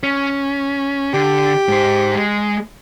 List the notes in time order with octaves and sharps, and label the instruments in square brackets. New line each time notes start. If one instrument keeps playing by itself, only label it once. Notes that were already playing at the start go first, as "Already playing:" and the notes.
[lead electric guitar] C#4
[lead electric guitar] D3 [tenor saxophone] G4
[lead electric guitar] G#2 C5
G#3